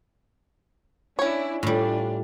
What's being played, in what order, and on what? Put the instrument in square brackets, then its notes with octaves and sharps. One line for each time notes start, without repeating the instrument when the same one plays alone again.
[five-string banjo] C#4 C#5 [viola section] D4 E4
[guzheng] A2 G3 [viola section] D4 F4